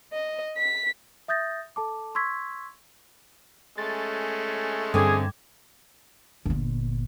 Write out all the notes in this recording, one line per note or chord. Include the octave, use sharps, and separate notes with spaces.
D#5
B6
E5 D#6 G6 A6 A#6
A4 A5 D6
C6 C#6 E6 G#6 B6
G#3 A3 C#4 A6
G2 D3 C4 G#4 D6 G#6
G1 A#2